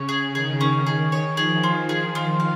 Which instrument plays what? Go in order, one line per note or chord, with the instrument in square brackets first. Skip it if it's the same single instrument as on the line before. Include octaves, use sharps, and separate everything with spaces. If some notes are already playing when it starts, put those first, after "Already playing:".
Already playing: [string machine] C#3 [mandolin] C#5
[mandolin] G#4
[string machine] D#3 [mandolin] G#4
[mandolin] C#4
G#4
C#5
[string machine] F3 [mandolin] G#4
[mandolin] F4
G#4
F4
F5